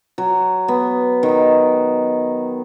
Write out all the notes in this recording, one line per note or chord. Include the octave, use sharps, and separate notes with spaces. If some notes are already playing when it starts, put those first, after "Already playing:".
F#3
B3
D#3